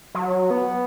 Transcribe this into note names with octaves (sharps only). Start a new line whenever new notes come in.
F#3
B3